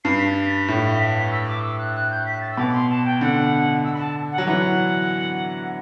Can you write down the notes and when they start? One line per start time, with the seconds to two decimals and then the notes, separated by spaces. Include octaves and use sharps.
0.04 G2 C7
0.19 B6
0.31 A6
0.45 B6
0.68 A2
1.32 E6
1.47 D6
1.62 E6
1.79 F#6
1.95 F#6
2.11 G6
2.26 B6
2.41 A6
2.51 E6
2.57 B2 D6
2.74 C6
2.90 A5
3.05 G5
3.21 D3 F#5
3.84 E6
3.94 B5
3.99 A5
4.32 F#5
4.38 F#3
4.47 E3 F#5